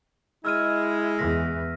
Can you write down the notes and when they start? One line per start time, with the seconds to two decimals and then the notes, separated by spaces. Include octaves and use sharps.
0.45 G#3 E4 E6 F6 D#7
1.19 E2 E3 A#6 B6